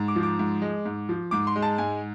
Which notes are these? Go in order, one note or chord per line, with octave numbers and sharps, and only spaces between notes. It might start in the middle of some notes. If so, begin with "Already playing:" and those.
Already playing: G#2
D6
F3
D6
G#2
G#3
G#2
F3
G#2 D6
C6
G#3
A5
G#2 G#5